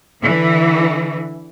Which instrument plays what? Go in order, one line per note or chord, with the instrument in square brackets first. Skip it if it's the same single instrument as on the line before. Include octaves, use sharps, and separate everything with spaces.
[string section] D3 E3